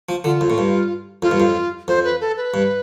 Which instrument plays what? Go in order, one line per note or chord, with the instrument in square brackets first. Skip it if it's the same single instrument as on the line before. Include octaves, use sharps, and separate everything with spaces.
[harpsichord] F3
[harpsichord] D3 [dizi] F4
[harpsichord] F2
A2
G2
[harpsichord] F2 [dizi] F4
[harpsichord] G2
F2
[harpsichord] F2 [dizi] C5
[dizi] B4
A4
B4
[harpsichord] G2